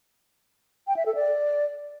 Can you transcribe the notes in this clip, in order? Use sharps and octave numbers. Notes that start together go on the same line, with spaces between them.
G5
E5
A4
D5